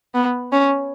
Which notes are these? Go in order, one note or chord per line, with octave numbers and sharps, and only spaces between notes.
B3
C#4